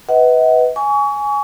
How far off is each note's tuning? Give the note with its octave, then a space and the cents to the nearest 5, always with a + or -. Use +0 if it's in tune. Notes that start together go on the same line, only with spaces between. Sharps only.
B4 +0 D#5 +45 F#5 +15
G#5 +0 C#6 +35